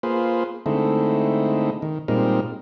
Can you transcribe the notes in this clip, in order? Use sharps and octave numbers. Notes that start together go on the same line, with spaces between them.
A#3 F4 G#4 B4 C5
D3 G#3 A3 C4 D#4 E4
D#3
A#2 G3 G#3 C4 D#4 A#4